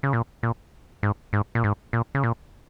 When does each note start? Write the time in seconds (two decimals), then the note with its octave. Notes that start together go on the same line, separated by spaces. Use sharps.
0.03 C#3
0.13 A#2
0.43 A#2
1.03 G#2
1.33 G#2
1.55 A#2
1.64 G#2
1.93 A#2
2.15 C#3
2.24 A#2